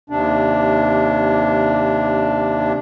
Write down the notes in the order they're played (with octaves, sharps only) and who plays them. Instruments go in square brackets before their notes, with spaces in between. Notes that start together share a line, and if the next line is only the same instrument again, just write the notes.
[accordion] D#2 C3 D4